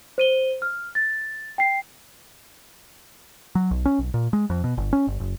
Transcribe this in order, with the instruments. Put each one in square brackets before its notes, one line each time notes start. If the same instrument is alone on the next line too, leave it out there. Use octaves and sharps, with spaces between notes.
[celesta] C5 D#7 G7
F6
A6
G5 C7
[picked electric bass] F#3
B1
C#4
B1
A#2
G#3
F2
B2
G1
C#4
G1
F#1